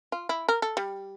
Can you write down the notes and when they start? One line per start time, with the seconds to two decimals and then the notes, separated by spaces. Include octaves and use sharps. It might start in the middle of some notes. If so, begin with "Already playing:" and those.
0.12 F4
0.29 E4
0.49 A#4
0.62 A4
0.77 G3